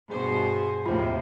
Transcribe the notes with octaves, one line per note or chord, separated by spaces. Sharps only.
G2 B2 G#4 C5
D#2 A2 C3 F3 F4